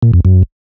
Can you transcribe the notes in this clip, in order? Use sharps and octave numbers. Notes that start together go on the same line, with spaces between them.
A#2
F2
F#2